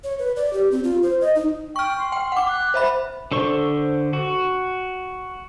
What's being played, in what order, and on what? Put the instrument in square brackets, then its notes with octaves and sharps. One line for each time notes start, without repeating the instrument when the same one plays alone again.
[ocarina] C#5
B4
D5
G4
C4
F4
C5
D#5
D#4
[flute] G5 [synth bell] C#6 F6
[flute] C6
[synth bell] G5
F#5 D6
[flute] F#6
[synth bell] C5 E5 B5
[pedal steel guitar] D3 A4 C5 C#6
F#4